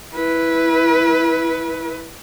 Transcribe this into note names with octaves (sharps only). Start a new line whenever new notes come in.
E4 B4